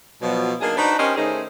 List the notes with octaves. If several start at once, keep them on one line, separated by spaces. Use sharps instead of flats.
B2 F3 F#3
A#3 D4 D#4 G#4
D4 D#4 F#4 B4 C5 D5
C#4 G4 A#4 C5 D#5
D#3 A3 C#4 D#4 G#4 C5